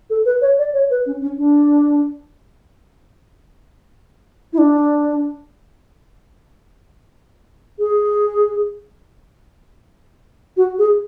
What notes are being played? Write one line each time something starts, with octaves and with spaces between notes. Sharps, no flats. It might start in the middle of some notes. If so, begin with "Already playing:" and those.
A4
B4
C#5
D5
C#5
B4
C#4
C#4
D4
E4
D4
G#4
F#4
G#4